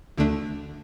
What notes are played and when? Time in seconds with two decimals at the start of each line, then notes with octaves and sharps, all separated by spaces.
0.17 D2 D3 A3 D4